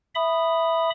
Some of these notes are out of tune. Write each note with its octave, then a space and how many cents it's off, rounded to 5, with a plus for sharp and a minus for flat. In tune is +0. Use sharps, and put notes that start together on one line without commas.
E5 +0 B5 +0 D#6 -10